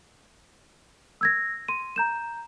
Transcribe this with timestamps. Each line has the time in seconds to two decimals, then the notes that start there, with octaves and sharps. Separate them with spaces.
1.21 E6 G#6 A#6
1.68 C6 D#7
1.96 A#5 G6 E7